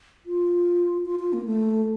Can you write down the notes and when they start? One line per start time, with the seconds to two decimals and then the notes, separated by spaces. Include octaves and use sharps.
0.26 F4
1.05 F4
1.19 F4
1.33 A#3
1.46 A3